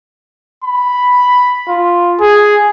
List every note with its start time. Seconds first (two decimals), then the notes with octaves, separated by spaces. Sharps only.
0.64 B5
1.68 F4
2.20 G#4